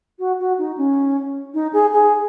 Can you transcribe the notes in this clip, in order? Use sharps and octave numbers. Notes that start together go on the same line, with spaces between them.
F#4
F#4
D#4
C#4
D#4
G#4
G#4